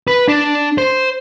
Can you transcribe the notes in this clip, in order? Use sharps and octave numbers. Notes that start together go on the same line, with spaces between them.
B4
D4
C5